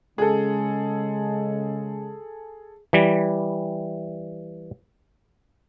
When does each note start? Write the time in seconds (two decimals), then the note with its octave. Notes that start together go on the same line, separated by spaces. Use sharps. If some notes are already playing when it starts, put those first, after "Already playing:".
0.18 C#3 G#3 G#4 A4
2.93 E3 G3